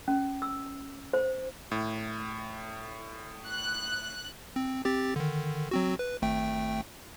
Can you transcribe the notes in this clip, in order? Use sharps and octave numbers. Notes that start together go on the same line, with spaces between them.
C#4
E6
C5
A2
F#6
C4
C4 G4 A6
D3 D#3
F#3 C4 F#4
B4
G#1 A3 G5